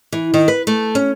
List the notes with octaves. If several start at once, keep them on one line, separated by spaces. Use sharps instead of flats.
E3
D#3
B4
A3
C#4